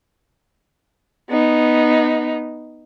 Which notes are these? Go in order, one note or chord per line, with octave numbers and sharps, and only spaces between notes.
B3 D#4